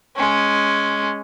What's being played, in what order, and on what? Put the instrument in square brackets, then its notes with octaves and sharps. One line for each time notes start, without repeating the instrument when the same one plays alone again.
[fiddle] G#3 C#4